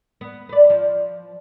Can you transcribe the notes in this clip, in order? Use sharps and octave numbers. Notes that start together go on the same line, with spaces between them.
B3
B4 D5
F3